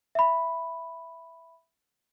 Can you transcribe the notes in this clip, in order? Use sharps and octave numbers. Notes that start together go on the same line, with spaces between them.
E5 B5